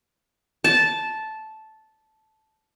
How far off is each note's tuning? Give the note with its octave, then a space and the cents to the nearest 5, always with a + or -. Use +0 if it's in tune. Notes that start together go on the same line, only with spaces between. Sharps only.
A5 -10